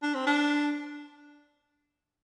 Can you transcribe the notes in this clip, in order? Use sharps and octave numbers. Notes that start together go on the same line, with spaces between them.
D4
C4
D4